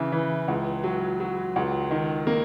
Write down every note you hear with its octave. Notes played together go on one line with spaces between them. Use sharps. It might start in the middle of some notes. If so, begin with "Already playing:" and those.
Already playing: C#3 E3
E3
C#2
F#3
F#3
C#2
D#3
A#3